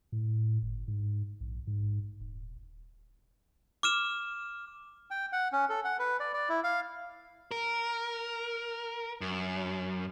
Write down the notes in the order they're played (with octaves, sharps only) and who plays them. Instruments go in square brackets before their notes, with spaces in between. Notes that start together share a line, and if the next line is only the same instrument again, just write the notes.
[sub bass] A2
G1
G#2
A#1
G#2
D#1
[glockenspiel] D6 F6 E7
[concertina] G5
F#5
C#4
A4
F#5
B4
D5
D5
E4
F5
[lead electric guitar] A#4
F#2